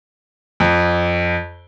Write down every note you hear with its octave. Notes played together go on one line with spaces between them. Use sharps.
F2